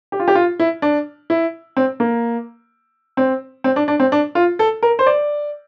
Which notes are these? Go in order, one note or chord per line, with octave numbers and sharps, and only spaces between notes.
G4
F4
G4
F4
E4
D4
E4
C4
A#3
C4
C4
D4
D4
C4
D4
F4
A4
A#4
C5
D5